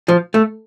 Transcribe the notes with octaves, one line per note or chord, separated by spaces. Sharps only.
F3
A3